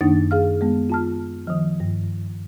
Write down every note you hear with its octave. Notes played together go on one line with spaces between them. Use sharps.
F#2 D#3 A#3 D4 D#4 A6
G#4 F5 F6
G#3 B3
F4 A5 F6
D#3 F3
G2